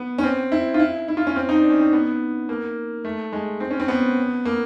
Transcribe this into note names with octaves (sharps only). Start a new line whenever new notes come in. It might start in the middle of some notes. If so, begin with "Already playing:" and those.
Already playing: B3
C#4
C4
E4
F4
E4
E4
F4
C#4
C4
D#4
D4
C#4
C4
B3
A#3
A3
G#3
C4
C#4
C4
B3
A#3